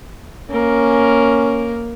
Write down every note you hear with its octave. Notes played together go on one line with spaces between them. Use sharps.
A#3 C#4 A#4